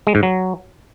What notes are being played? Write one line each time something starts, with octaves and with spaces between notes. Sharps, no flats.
G#3
G#2
F#3